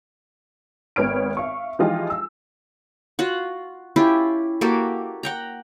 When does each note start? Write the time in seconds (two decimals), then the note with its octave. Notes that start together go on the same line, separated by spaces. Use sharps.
0.96 G#1 B3 B4 C#5 F6 D7
1.37 E5 F5 C#6
1.79 E3 F3 G#3 D#4 F4 G4
2.10 E6
3.19 F4 F#4 F#5
3.96 C#4 E4 F4 G4
4.61 A#3 F#4 G4 A4
5.23 F#5 G5 A#5